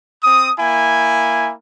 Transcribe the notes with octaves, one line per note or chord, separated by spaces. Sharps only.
C4 D#6
A#3 E4 G#5